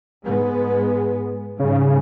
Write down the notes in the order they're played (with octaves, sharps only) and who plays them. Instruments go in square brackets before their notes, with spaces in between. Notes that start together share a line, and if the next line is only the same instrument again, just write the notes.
[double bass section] G#2 G#3 B3
[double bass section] G#2 G3 [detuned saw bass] C#3